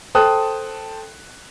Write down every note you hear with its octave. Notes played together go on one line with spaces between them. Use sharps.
A4 C5 G5 A5 D#6 F#6